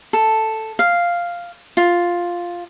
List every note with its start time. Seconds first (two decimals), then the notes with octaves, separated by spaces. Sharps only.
0.13 A4
0.79 F5
1.77 F4